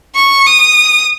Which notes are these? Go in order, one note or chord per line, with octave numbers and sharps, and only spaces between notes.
C#6
D#6